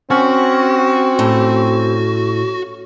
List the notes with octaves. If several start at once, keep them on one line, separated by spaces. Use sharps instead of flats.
C4 C#4 F#4
A2